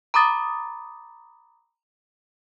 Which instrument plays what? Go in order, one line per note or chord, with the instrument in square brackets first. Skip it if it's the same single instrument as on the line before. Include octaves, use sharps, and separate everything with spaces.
[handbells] A#5 B5 D6 D#6 A6